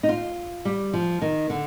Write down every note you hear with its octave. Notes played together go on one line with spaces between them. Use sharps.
D#4
F4
G3
F3
D#3
D3